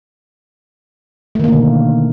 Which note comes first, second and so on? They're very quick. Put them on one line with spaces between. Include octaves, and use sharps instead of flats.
A3 D#3 A#3 D3 B2